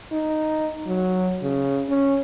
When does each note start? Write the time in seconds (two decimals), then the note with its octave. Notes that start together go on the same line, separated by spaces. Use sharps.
0.12 D#4
0.86 F#3
1.42 C#3
1.89 C#4